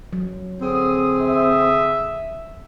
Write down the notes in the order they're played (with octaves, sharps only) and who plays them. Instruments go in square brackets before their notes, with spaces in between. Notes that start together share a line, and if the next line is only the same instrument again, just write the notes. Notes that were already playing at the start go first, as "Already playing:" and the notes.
[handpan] F#3
[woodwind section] D3 G#4 D#6 [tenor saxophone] C4
[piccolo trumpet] E5